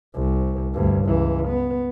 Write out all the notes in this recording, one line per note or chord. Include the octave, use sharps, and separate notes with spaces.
C2
D2 G2
C#2 E3
B3